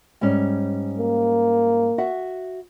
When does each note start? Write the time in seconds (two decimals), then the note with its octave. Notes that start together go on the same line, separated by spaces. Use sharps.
0.21 G#2 G3 C#4
0.99 A#3
1.98 F#4 E5 F#5